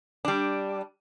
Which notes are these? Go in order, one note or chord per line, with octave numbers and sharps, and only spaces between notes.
G3 D4